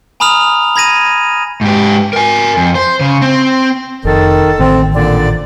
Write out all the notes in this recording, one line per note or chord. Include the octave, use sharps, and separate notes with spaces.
G#5 A#5 B5 D#6 F6 F7
B5 G#6 A#6 D#7
G#2 G4
A#4 G#5
F2
C5
C#3
C4
F1 D#3 A4
A1 D#3 C4
A#2 D3 D5